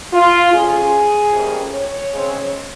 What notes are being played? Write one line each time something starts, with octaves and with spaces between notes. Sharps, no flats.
F4
F2 C#3 G#3 C#4 G#4
F2 C3 G3 A#3 C#4
C#5
C#3 G#3 C4